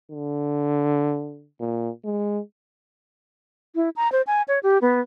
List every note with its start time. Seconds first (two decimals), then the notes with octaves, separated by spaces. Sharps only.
0.11 D3
1.60 A#2
2.05 G#3
3.75 E4
3.96 A#5
4.12 C5
4.27 G#5
4.48 C#5
4.63 G4
4.82 B3